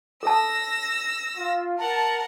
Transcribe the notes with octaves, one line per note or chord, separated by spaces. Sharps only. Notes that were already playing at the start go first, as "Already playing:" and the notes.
A4 A5 E6 A#6
F4
A#4 F#5 A5